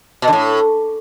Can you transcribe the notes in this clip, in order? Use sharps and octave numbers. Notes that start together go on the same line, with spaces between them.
B2
D3
A2